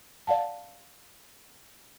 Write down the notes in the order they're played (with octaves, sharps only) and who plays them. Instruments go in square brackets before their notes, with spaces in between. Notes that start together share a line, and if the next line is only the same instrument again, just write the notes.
[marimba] D5 F5 F#5 A5